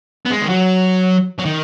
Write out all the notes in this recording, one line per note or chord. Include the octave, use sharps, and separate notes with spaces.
B3
G#3
D#3
F#3
F#3
D#3